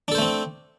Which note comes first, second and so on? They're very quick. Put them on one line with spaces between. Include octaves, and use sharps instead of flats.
D4 A4 C5 A3 C4